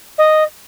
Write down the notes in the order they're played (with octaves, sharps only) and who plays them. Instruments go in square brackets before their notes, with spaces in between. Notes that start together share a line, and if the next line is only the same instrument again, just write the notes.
[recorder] D#5